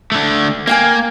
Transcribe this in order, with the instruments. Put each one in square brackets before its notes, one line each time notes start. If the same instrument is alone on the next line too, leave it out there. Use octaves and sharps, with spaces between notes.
[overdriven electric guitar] D3 A3
[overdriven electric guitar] A#3 [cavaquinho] F5 G5 G#5